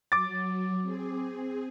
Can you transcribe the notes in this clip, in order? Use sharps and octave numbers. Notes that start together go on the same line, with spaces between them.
F#3 D6 A6
C4 G#4